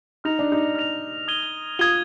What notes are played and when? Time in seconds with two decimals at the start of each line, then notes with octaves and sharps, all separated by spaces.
0.24 D#4 F6 A#6 F7
0.39 D4
0.52 D#4
0.75 F6 A#6 F7
1.28 D#6 G#6 D#7 G7
1.79 F4 D#6 G#6 D#7 G7